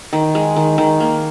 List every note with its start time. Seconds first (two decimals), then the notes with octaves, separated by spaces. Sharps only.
0.13 D#3
0.35 G#3
0.56 D#3
0.78 D#3
1.00 A#3